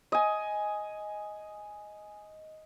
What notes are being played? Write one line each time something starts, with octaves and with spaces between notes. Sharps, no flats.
D#5 G#5